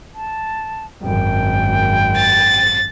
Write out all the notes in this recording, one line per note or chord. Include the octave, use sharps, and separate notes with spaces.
A5
G#1 F#2 G5
A6